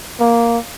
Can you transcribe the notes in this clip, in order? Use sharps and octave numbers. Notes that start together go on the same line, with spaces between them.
A#3